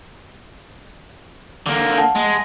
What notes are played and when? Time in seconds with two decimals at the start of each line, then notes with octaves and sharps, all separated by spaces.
1.66 D3 A#3
1.98 F#5 A5
2.16 G#3